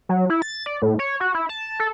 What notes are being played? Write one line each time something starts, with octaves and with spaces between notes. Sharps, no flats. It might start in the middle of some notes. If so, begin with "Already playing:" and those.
F#3
E4
A6
D5
A2
C#5
F#4
E4
A5
A4